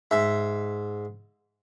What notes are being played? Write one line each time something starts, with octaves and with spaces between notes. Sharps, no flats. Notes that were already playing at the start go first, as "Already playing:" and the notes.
G#2 E5